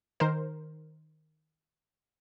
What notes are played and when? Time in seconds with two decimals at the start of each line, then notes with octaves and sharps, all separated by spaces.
0.20 D#3 A#4 C5